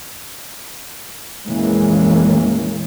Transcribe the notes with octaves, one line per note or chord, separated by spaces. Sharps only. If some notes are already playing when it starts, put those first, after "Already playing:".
F2 A#2 E3 G#3 A#3 C#4